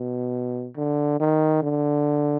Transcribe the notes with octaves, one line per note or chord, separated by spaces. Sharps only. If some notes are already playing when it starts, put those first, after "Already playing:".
Already playing: B2
D3
D#3
D3